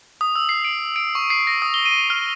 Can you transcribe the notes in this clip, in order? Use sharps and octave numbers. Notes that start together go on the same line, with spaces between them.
D#6
E6
C7
D7
D7
C#6
C7
A#6
D#6
G7
D#7
F6